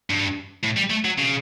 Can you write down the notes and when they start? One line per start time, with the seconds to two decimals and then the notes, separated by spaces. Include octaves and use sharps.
0.10 G2
0.64 A2
0.77 G3
0.90 A3
1.05 F#3
1.18 C#3